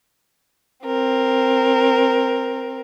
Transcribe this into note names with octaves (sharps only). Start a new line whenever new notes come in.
C4 A#4